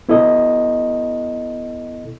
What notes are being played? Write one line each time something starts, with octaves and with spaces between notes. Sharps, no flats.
B3 E4 A4 D#5